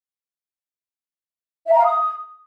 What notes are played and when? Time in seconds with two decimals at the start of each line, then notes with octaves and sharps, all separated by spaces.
1.65 E5
1.72 A#5
1.78 F5
1.84 D#6